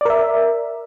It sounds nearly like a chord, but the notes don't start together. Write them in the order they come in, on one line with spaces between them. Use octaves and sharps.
D5 A#4 E5